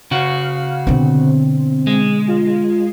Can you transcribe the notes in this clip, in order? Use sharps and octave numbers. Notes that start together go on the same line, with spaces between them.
C#3 F#4 F5
B2 D3 C4
G#3
F4